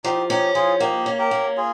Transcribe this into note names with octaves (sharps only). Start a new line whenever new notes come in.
F3 D#4 G4
C#4 D#4 G4
F3 F4 G#4
A#3 D#4 G4
C#4
G4 A#4
A#3
F4 G#4